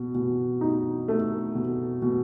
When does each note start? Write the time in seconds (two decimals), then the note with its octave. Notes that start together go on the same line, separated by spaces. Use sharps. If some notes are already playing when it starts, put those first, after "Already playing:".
Already playing: B2
0.15 B2
0.61 D#4
1.08 A3
1.55 B2
2.02 B2